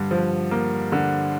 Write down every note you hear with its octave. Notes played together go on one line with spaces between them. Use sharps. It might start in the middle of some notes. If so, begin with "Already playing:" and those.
Already playing: G2 D3
F3
A#3
D3